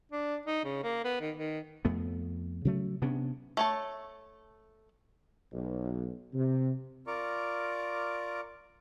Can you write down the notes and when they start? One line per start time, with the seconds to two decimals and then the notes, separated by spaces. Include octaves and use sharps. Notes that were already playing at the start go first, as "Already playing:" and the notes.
0.12 D4
0.46 D#4
0.64 C#3
0.83 A#3
1.04 B3
1.20 D#3
1.36 D#3
1.85 F2 A3 B3
2.65 C#3 F#3 A3
3.02 C3 B3 C#4 D4
3.57 A3 C#5 A5
5.53 B1
6.34 C3
7.07 F4 A#4 D5 A#5 C#6 D6